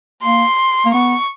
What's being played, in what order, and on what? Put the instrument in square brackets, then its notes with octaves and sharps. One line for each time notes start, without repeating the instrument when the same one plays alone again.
[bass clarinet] A#3 [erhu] C6
[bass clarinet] A#3
[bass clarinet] B3 [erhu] C#6